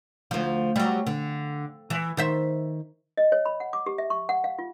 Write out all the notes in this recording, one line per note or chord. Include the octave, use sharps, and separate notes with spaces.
D2 F3
F#3 G3
D3
E3
D#3 C5 E5
D#5
C#5
B5
F#5
D6
G4
E5
C#6
F#5
F5
F4